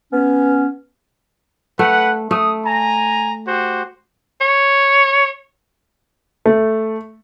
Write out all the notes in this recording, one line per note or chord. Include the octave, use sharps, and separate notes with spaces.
B3 C#4
A3 B4 F#5
A3 D#6
G#5 A#5
F#4 G4 C5
C#5
A3